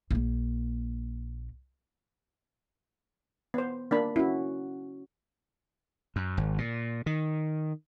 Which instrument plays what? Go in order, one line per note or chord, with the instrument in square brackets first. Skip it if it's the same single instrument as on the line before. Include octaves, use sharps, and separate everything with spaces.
[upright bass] A#1 A#3
[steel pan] B3 C5
A#3 D4 B5
[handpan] C#4 F#4 [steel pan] E4
[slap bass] F#2
G#1
A#2
D#3